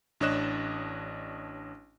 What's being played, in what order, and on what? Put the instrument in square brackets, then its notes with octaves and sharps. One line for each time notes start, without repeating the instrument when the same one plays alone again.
[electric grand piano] A1 D4 C#5 D#5 F#6 E7